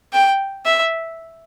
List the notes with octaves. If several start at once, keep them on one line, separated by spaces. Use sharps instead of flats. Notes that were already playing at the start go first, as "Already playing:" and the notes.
G5
E5